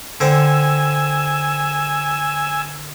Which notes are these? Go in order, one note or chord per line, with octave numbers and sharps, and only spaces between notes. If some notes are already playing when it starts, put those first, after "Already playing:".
D3 C4 G#5 E6